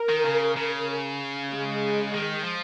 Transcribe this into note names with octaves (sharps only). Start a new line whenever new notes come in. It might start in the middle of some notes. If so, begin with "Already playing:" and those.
Already playing: A#4
D#3
C#3
C#3
G#3
D#3
F3